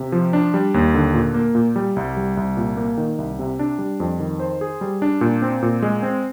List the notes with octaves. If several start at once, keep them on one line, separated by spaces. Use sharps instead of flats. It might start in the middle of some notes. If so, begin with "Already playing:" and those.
Already playing: C3
F3
D4
G3
D#2
D3
A#2
A#3
A#2
G3
C2
G3
C2
A#2
A#3
D#3
C2
C3
D4
G3
F2
D#3
C5
G#4
G3
D4
A#2
C4
A#2
G#3
C4